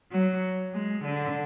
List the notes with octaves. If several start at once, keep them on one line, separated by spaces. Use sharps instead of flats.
F#3
G#3
D3